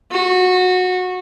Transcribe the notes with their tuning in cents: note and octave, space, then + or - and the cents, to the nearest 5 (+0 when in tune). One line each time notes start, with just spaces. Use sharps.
F#4 -20